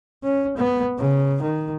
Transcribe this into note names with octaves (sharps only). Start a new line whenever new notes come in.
C#4
B3
C#3
D#3